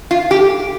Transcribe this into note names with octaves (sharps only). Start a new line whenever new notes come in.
F4
G4